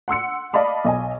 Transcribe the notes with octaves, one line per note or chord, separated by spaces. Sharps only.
F#5 C6 E6 C#7
D5 D#5 F5 A5 B5 D6
B1 D#5 G#5